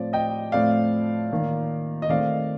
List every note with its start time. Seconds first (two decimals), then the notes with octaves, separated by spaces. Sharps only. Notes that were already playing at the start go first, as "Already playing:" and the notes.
Already playing: A2 F3 C4 D5
0.13 D#5 G5
0.52 A2 F3 A3 C4 D5 F5
1.31 D#3 A#3
2.02 D#5
2.09 D#3 A3 C4 D5 F5